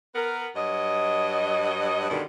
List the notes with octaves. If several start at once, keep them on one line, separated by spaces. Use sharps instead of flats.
B3 A#4
G2 F#3 D#5
G2 B2 D3 D#3